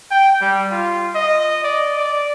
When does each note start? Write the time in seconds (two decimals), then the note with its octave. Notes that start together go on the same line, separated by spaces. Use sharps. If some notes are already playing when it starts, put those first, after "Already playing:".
0.11 G5
0.41 G3
0.71 F4
1.15 D#5
1.64 D5
1.97 D5